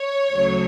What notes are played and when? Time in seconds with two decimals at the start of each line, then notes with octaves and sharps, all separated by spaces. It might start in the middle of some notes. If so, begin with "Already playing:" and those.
Already playing: C#5
0.31 D2 C#3 F#3 A3